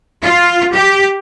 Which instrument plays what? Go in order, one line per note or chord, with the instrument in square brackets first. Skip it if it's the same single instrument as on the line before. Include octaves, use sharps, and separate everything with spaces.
[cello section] F4
G4